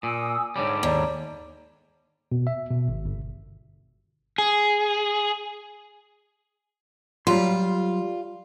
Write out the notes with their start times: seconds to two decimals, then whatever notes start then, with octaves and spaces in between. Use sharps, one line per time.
0.03 A#2 G#5 D#6 E6
0.56 G#2 D3 G3 C#5
0.83 D#2 D5 A#5
2.32 B2
2.47 E5
2.70 B2
2.88 G#1
3.05 G1
4.38 G#4
7.27 F#3 G3 F4 C6